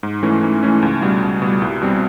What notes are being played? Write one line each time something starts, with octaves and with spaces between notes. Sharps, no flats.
G#2
E3 A3 C#4
G#2
E3 A3 C#4
C#2
B2 G3
C#2
B2 G3
C2
B2 G3 C4